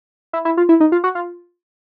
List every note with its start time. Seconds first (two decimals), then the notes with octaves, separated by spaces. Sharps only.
0.33 E4
0.45 E4
0.57 F4
0.69 E4
0.80 D#4
0.92 F4
1.04 F#4
1.15 F4